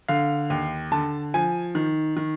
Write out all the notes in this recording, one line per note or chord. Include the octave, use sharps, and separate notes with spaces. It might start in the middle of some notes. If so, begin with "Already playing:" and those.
D3 F5
D#2
D3 A5
F3 G#5
D#3
D#3